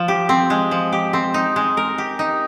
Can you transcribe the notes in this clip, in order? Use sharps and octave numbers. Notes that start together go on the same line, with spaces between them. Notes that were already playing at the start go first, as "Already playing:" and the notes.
Already playing: F3
G4
C4
G#3
F3
G4
C4
D#4
G#3
A#4
G4
D#4